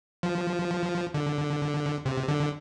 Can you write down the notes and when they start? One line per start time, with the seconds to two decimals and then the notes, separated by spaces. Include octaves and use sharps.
0.23 F3
1.14 D3
2.05 C3
2.28 D3